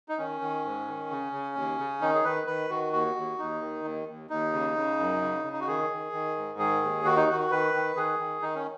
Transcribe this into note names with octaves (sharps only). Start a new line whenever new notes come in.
D#4
D#3 C#4
D#3
G#2
D#3
C#3
C#3
D#2
C#3
D#3 D#4
G#4
D#3 B4
D#3 B4
D#3 F#4
D#2 F#4
D#2
D#2 D#4
D#3
D#2
D#2
D#2 D#4
C#3
C#3
F#2
C#3
C#3
D#4
F#4
D#3 G#4
D#3
D#3
G#2
D#3 G#4
D#2
D#3 F#4
D#4
D#3 F#4
D#3 B4
D#3
D#3 G#4
D#3
D#3 D#4
C#4